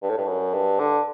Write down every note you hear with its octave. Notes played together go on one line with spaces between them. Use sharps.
G2
A2
G2
F#2
G2
D3